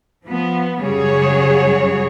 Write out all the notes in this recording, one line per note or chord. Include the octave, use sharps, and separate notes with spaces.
F3 B3
F#2 C#3 G3 F#4 G#4 C#5